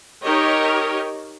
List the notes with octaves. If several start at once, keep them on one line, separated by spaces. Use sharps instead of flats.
D#4 G4 A#4 C#5 D#5